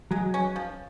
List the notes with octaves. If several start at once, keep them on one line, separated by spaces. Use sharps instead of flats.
F#3 G#3
C#4
F3